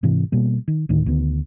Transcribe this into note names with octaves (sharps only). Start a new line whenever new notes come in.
G#2 C3 E3
B2 G3 A#3
D#3
D2 A2 D#3
D2 D#3 B3